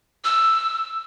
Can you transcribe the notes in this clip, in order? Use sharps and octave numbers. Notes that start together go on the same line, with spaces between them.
E6